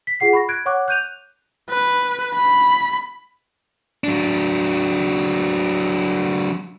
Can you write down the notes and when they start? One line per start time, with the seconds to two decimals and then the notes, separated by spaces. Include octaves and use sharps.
0.07 B6
0.20 F4 G#4 F#5 C7
0.33 B5 C#6 A#6
0.49 F#6 G#6 D7
0.66 C#5 F#5 C#6 D6 F#6
0.88 F#6 G6 D#7 F7
1.70 B4
2.35 B5
4.04 F#3 D4